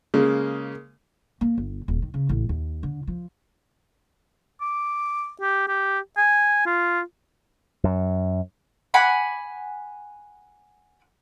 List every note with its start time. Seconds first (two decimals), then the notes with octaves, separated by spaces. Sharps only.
0.14 C#3 G#3 A#3
1.41 A#3
1.58 G1
1.88 D#1
2.02 D#3
2.14 C#3
2.29 A1
2.49 D#2
2.83 D3
3.07 F3
4.61 D6
5.41 G4
5.68 G4
6.17 G#5
6.66 F4
7.84 F#2
8.94 F#5 G#5 B5 D6